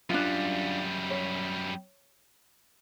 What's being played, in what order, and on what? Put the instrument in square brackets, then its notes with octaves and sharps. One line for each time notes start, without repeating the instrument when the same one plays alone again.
[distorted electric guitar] F#2 G3 [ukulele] D4 F4
[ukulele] C#5